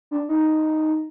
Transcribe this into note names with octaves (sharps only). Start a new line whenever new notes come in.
D4
D#4